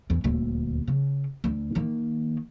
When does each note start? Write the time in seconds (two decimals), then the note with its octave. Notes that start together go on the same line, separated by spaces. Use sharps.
0.10 E2
0.24 D#1 D2
0.88 C#3
1.44 D2
1.75 D#3 A#3